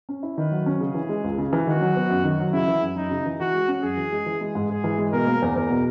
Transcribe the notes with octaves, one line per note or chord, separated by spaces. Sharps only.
C#4
E4
D#3 B4
F#3
C#4
C#3 G#4
E3
G#3
C#2
C#3
E3
D#3 F#4
F#3
B3
F#2
D#3
F#3
C#3 E4
E3
F#2
F#2 D#4
C#3
E3
E3 F#4
G#3
C#4
F#2 G#4
E3
G#3
E3
G#3
G#2
G#2 G#4
E3
G#3
B2 A#4
A#3
E2
E2 A#4
B2